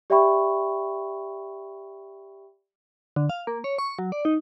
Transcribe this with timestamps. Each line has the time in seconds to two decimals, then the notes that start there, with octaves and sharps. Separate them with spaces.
0.10 G4 D5 E5 G5 B5 C#6
3.16 D3
3.30 F5
3.47 A#3
3.64 C#5
3.78 C#6
3.99 F#3
4.12 D5
4.25 D#4